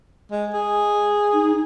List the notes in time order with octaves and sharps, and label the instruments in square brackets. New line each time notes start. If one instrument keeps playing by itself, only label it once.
[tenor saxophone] G#3
G#4
[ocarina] D#4